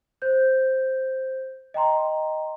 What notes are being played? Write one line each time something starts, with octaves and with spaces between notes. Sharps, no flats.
C5 G6
D#5 G5 A#5 C6